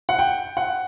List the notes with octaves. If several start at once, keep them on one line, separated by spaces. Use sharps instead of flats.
F#5
G5
F#5